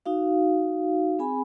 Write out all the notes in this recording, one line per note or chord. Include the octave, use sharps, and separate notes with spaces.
D#4 F#4 F5
C4 G#4 G#5 B5